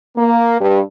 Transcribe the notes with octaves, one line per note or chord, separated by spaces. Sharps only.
A#3
G2